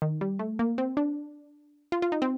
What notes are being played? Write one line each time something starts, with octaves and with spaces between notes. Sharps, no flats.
D#3
G3
A3
A#3
C4
D4
F4
F4
D#4
C4